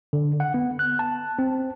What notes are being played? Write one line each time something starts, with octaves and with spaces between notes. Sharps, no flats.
D3
F#5
B3
F#6
A5
C4